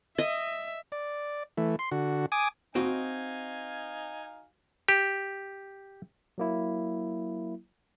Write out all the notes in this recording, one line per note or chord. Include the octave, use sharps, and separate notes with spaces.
D#5 E5
D5
E3 A3
C6
D3 F#4
G#5 D6 D#6
C4 D#4 F#4 D#5 F5 G#5
G4
F#3 A#3 E4